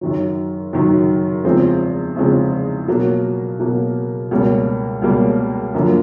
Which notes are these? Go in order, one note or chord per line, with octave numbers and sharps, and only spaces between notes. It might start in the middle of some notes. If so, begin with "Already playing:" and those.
F#2 D#3 F#3
F#2 D#3 F#3
E2 C#3 F3 G#3 C4
E2 C#3 F3 G#3 C4
B2 F#3 A#3
B2 F#3 A#3
C#2 B2 G3 A#3 C#4
C#2 B2 G3 A#3 C#4
F#2 D3 F3 A#3